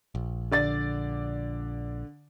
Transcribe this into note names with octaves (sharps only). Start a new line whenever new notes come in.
A#1
D3 D5 A6